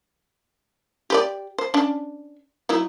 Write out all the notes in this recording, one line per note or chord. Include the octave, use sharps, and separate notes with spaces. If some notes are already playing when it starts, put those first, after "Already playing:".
G4 B4 D5
C5
C#4 D4
F#3 D#4 E4